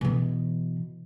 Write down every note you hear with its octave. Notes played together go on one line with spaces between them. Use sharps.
B2 E3